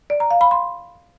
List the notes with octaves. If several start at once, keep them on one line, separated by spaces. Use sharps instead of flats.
D5
A#5
F5
B5
C6